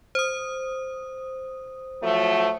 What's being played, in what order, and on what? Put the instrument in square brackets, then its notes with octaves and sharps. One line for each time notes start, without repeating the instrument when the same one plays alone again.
[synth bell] C5 D#6
[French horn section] F3 F#3 A3